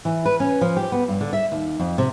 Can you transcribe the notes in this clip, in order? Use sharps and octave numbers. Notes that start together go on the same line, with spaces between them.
E3
B4
C#4
F3
G4
B3
G2
D3
E5
D#2
F2
C3